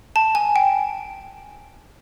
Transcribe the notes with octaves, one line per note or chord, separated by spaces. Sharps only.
A5
G#5
G5